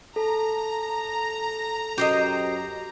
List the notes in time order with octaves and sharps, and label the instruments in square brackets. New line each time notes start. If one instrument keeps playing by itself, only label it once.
[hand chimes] A4 [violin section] A#5
[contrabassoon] F#2 [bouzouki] G4 C5 D#5